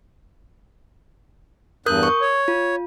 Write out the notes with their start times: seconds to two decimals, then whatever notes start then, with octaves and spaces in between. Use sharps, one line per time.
1.86 E2 G2 A#4 D#6 F#6 G6
2.03 C#6
2.21 C#5
2.48 F4